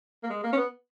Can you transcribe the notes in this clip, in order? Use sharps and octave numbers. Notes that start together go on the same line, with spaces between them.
A#3
G#3
A#3
C#4
B3